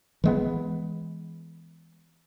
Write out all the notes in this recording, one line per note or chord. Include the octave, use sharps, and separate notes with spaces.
E3 G#3 B3